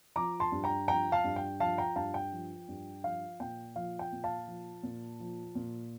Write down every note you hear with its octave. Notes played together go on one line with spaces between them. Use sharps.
F3 A#5 D6
A5 C6
G2
G5 A#5
F3 G5 A#5
F5 A5
G2
G5
F3 F5 A5
G5 A#5
G2 F5 A5
G5
F3
G2
F3 F5
A#2 G5
F3 F5
G5
A#2
F5 A5
F3
A#2
F3
A#2